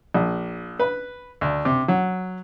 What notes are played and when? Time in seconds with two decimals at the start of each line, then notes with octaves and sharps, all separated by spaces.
0.14 A#1
0.80 B4
1.41 D2
1.65 C3
1.88 F#3